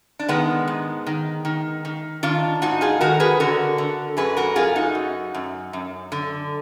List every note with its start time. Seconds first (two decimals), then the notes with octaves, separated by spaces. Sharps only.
0.19 D4
0.29 D#3 G#3 B3
0.68 G#2
1.06 D#3
1.45 D#3
1.85 D#3
2.23 D#3 D4 F4
2.62 G#2 D#4 F#4
2.81 F4 G#4
3.01 D#3 F#4 A#4
3.20 G#4 B4
3.40 D3 F#4 A#4
3.78 D3
4.17 F#2 G#4 B4
4.37 F#4 A#4
4.56 F#2 F4 G#4
4.76 D#4 F#4
4.95 F#2
5.34 F#2
5.73 F#2
6.12 D3